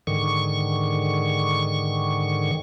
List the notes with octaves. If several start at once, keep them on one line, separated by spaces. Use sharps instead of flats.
G#2 D3 D#3 C#6